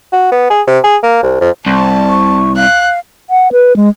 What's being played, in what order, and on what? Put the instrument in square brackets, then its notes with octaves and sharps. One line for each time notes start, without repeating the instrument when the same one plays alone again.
[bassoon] F#4
B3
G#4
C3
G#4
A#3
C2
F2
[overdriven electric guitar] C2 [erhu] A5
[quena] C#6
[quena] F5 [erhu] F#6
[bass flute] F#5
B4
G#3